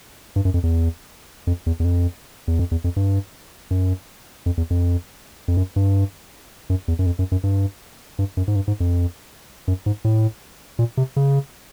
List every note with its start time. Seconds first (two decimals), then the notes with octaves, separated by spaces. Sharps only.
0.36 G2
0.45 F#2
0.54 F2
0.63 E2
1.47 F2
1.66 E2
1.80 E2
1.85 F2
2.48 E2
2.59 F2
2.71 E2
2.84 F2
2.96 G2
3.71 F#2
4.46 F2
4.57 E2
4.70 F2
5.48 F2
5.57 F#2
5.76 G2
6.70 F#2
6.88 E2
6.99 F#2
7.06 F2
7.19 F#2
7.32 F#2
7.44 G2
8.19 G2
8.37 F#2
8.48 G#2
8.56 G2
8.68 G#2
8.80 F2
9.68 F#2
9.86 G#2
10.05 A2
10.79 A#2
10.97 C3
11.16 C#3